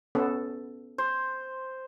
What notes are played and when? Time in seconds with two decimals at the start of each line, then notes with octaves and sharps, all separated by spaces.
0.15 B3 C#4 A4
0.98 C5